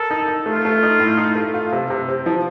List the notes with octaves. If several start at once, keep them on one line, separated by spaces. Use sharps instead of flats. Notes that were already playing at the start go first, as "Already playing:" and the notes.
Already playing: A4 A#4
D#4
D#4
A3 F4
A3
D#4
A2
D#4
A3
F4
C3
C3
C4
F3